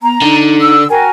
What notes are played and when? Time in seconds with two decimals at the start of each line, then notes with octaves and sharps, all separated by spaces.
0.02 B3 A#5
0.22 D3 D#4
0.61 E6
0.90 F#4 A#4 G5 G#5